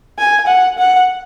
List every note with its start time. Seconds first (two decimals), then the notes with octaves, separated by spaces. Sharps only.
0.18 G#5
0.47 F#5
0.78 F#5